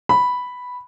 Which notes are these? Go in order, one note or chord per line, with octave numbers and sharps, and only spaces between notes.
B5